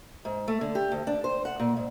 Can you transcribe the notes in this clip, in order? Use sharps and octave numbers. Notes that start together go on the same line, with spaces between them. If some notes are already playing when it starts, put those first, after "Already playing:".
G#2
A3
D3
G4
D2
D4
C5
F#5
A#2
G#2